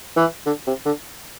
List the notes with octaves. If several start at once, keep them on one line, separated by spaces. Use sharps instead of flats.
E3
D3
C3
D3